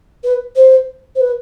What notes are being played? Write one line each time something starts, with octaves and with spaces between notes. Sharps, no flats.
B4
C5
C5
B4